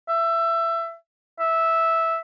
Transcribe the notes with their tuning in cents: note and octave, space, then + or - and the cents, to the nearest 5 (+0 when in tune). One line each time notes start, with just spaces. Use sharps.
E5 +20
E5 -10